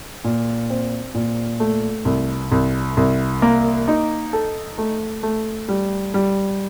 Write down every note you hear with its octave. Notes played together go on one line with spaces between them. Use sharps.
A#2
C4
A#2
A3
C2
C2
C2
A#3
D#4
A4
A3
A3
G3
G3